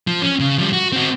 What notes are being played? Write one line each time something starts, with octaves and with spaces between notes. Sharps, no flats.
F3
C#4
C#3
F3 G3
F#4
C4 F#4